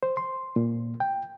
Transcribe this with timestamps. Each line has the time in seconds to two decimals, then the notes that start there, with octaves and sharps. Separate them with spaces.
0.03 C5
0.17 C6
0.56 A#2
1.00 G5